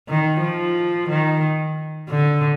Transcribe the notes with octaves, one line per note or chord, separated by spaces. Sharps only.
D#3
F3
D#3
D3